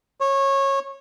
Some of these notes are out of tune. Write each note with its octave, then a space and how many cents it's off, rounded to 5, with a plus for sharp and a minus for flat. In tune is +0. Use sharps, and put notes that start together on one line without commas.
C#5 -20